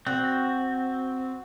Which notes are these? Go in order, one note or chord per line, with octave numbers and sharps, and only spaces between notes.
C4 F#4